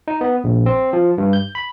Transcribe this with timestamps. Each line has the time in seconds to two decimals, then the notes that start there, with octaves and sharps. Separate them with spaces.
0.08 D#4
0.21 B3
0.44 A#1
0.66 C4
0.93 F3
1.18 G2
1.33 G6
1.55 B5